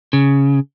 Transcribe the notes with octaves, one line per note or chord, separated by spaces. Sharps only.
C#3